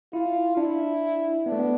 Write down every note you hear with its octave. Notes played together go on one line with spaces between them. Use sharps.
E4 F4
D4 E4
B3 D4
A3
B3